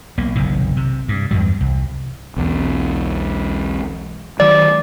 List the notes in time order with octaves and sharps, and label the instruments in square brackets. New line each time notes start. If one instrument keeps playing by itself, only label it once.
[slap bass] B1 A#3
F#1 B1 C3 D#3
C3
G2
E2 G2 F#3
C2
[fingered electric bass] B1 E2
[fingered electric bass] D#3 F#3 [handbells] D5